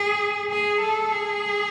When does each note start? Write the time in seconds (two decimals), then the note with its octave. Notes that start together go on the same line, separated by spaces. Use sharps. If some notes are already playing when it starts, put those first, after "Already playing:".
Already playing: G#4
0.51 G#4
0.81 A4
1.12 G#4